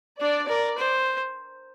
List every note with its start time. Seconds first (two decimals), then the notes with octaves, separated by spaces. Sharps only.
0.20 D4 D5
0.48 A#4 D5
0.78 C5